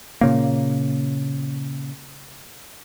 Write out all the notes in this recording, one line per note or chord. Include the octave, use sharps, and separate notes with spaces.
A#2 C#3 A#3